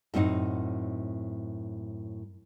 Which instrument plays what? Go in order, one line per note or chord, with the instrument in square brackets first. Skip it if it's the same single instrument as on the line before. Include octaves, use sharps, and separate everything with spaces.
[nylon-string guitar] F#2 A2 C4 D#4 F#5